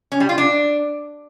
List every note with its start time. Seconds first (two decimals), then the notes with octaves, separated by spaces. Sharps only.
0.12 C#4
0.20 G3
0.29 F4
0.38 D4